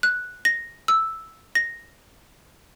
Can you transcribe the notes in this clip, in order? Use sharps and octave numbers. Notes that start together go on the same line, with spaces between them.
F#6
A#6
E6
A#6